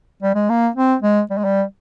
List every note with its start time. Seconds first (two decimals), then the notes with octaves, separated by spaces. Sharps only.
0.22 G3
0.35 G#3
0.50 A#3
0.76 C4
1.03 G#3
1.31 G3
1.38 G#3
1.45 G3